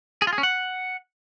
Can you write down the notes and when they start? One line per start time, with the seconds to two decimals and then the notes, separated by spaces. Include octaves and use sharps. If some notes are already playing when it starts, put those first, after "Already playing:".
0.22 G#4
0.27 F4
0.33 G#4
0.38 C#4
0.43 F#5